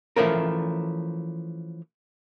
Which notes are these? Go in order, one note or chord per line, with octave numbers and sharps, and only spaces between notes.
E3 F3 A3 C#4 A#4